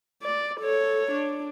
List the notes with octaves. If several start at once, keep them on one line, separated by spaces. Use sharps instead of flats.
D5
A4 C#5
D4